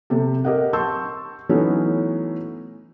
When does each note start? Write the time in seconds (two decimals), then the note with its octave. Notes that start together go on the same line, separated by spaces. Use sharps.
0.10 C3 G4 A4
0.45 G4 A#4 D#5 F#5
0.73 A5 C6 C#6 E6 G6
1.49 E3 F#3 A3 B3 C#4 D#4